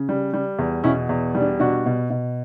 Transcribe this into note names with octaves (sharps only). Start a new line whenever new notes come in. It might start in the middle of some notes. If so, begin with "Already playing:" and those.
Already playing: C#3
G3
G3
E2
B2 C#4 E4
E2
G3
D4
B2 D4 F#4
B2
B2